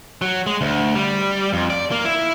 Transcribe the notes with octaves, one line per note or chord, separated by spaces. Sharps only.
F#3
G#3
D2
G3
F2
D5
A#3
E4